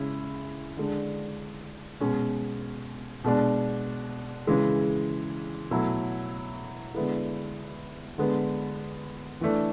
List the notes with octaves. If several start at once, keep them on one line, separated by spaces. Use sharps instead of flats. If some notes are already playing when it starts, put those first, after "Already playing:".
Already playing: C#3 G#3 C#4 E4
D3 G#3 D4
B2 G#3 C#4
B2 G#3 D4
C#3 E3 G#3
B2 F#3 A3 E4
D3 G#3 B3 E4
D3 G#3 B3
E3 A3 D4